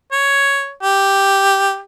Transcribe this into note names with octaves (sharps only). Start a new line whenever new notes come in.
C#5
G4